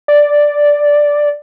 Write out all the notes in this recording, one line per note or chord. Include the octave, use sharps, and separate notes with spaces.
D5